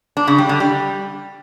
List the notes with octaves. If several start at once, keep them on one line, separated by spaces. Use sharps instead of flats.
D4
C#3
G3
D3
G3